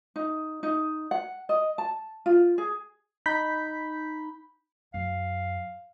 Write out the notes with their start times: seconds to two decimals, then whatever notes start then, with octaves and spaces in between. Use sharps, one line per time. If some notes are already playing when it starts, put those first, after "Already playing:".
0.16 D#4
0.63 D#4
1.11 F#5
1.49 D#5
1.78 A5
2.26 F4
2.58 G#4
3.26 D#4 B5 G6 B6
4.94 F#2 F5